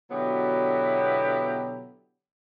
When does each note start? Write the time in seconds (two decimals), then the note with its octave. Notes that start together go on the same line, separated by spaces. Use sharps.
0.11 B2 D3 F#3 B3 E4 G4